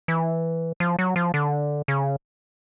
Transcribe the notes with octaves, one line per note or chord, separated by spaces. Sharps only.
E3
F3
F#3
F3
D3
C#3